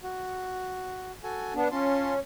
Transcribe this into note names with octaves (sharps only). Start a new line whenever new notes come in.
F#4
F#4 A4 G#5
B3 D4
C#4 F4 A5 C6